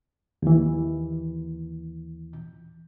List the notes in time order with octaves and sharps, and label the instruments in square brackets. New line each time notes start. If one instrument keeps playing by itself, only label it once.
[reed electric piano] D#2 E3